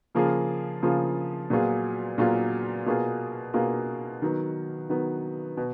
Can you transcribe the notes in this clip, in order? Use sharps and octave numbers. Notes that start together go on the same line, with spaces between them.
C#3 F3 A#3 F4 G#4
C#3 F3 A#3 F4 G#4
A#2 F#3 B3 F4 G#4
A#2 F#3 B3 F4 G#4
B2 A#3 F4 G#4
B2 A#3 F4 G#4
D#3 F#3 B3
D#3 F#3 B3
B2